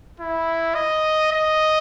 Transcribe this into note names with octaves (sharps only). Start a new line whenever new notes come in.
E4
D#5
D#5